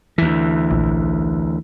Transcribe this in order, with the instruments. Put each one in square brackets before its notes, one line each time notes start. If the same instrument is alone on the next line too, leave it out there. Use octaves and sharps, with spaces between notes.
[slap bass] D2 E3
[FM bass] A#1